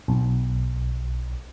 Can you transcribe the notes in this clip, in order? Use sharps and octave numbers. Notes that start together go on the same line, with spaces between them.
B1